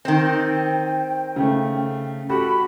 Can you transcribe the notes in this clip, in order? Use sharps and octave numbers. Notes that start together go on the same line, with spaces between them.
D#3 C4 G5
C#3 A3
F#4 G4 A4 B5